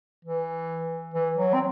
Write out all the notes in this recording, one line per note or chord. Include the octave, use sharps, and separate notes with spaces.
E3
E3
F#3
C4